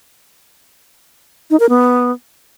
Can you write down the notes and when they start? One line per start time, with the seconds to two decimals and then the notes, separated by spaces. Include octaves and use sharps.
1.50 D#4
1.60 A#4
1.69 B3